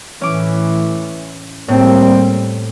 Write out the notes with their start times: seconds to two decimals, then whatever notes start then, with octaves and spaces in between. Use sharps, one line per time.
0.21 A2 E3 C#4 D6
1.68 A2 G3 A#3 C4